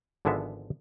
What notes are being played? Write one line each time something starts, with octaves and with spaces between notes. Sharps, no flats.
G#1 D3 F3 G#3 B3 E5